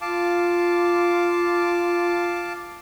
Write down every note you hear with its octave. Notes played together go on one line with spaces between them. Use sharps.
F4 F5 A5 D6